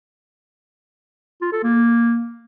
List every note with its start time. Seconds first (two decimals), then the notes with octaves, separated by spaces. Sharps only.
1.41 F4
1.52 A4
1.63 A#3